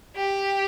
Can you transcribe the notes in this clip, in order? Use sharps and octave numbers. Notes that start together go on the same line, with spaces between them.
G4